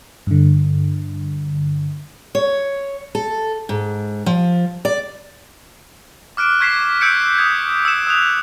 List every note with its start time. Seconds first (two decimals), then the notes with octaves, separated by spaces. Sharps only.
0.27 G2 D3
2.35 C#5
3.15 A4
3.69 G#2
4.26 F3
4.85 D5
6.37 D6 F6 F#6 D7
6.60 C#6 G#6 B6 C7 E7
7.01 E6 F6 G6 G#6 C#7 D7
7.38 D#6 G#6
7.85 E6 C#7 E7
8.07 D#6 F#6 F7